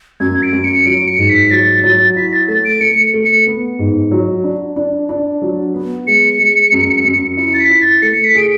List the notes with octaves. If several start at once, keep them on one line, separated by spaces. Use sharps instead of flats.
F#2 G#6
D7
F#2
C#7
F#3 D7
C#7
G#2
B6
F#3 A6
F#3
E4 B6
A6
A3 A6
D7
A3 C#7
A3
C#7
B3
G#2
F#3
D4
D4
D4
F#3
B3
G#3 C#7
G#3
F#2
F#2
E4 C#7
A6
B6
E4
A6
A3 C#7
B6
G#4 D7